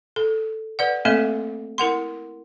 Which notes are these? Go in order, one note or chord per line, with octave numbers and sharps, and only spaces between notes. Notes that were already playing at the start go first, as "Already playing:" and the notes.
A4
B4 D5 F#5
A3 A#3 C4 A4 D#5 E5
E4 A#4 F#5 C6